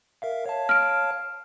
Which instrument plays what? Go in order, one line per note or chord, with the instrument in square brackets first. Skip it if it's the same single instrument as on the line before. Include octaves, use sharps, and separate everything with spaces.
[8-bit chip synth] A#4 E5 F5
C#5 F5 A5
[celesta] F6 D7